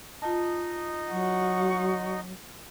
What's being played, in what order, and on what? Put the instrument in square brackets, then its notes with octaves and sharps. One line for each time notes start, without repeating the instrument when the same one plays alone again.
[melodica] D#4 D#5 [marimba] F4 A5
[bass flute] F#3 [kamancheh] F#5 C#6